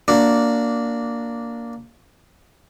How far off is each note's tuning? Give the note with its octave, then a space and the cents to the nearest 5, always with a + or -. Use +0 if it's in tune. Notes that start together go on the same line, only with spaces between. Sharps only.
A#3 +0 D4 -10 F#4 -15